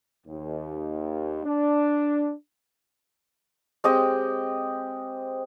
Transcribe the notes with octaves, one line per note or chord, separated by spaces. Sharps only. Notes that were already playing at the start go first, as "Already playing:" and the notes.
D#2
D4
G#3 C4 G4 D#5